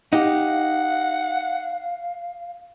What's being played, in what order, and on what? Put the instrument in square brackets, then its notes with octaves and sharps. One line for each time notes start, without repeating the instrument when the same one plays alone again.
[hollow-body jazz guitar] D#4 G4 [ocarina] F5 [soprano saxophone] F#5